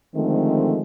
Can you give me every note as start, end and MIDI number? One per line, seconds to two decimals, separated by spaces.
0.15 0.82 50
0.15 0.82 51
0.15 0.82 53
0.15 0.82 56
0.15 0.82 57
0.15 0.82 60